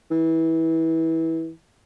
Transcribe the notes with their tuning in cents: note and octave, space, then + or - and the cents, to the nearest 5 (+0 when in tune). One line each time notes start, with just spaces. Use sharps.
E3 -25